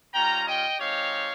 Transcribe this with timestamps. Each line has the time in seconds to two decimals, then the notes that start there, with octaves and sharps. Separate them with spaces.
0.14 G3 C#4 F4 G5 A#5
0.47 D#5 G5
0.80 G#3 C4 D#4 G4 C#5 F5